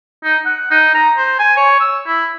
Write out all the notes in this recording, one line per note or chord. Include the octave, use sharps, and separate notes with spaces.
D#4
F#5
D#4
A#5
C5
G#5
C#5
E6
E4